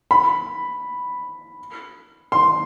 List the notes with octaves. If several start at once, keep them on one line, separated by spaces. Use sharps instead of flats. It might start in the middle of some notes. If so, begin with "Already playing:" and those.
B5
C6